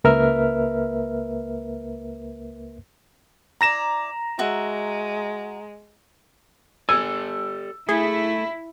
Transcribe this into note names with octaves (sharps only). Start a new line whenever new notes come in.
C#2 A#3 A#4 B4 E5 F6
E4 D5 A#5 A#6 E7
G#3 F#4 E5
G4 A4 D5 G#5 E6
A3 E4 G#4